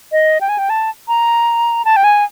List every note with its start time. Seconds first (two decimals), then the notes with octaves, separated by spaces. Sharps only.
0.12 D#5
0.41 G5
0.49 G#5
0.58 G5
0.70 A5
1.08 A#5
1.85 A5
1.96 G5
2.04 G#5